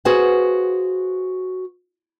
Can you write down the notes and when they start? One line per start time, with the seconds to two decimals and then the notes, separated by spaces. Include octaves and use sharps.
0.05 F#4 G#4 B4 C5 F5 F#5